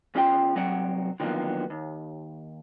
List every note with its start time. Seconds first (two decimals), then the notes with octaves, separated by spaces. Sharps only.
0.15 E2 C#4 F4 G5 C6
0.55 C2 F#3 C4 F#5 G5
1.20 D3 D#3 F3 F#3 A#3 B3
1.70 D#2